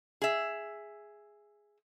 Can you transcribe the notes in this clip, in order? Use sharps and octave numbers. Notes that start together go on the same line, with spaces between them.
G#4 E5